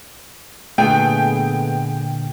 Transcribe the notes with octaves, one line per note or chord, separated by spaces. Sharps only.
A#2 D3 A3 B3 G#4 G5